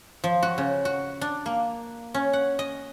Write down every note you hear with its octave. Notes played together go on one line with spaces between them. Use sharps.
F3
F#4
C#3
F#4
D4
A#3
C#4
F#5
D#5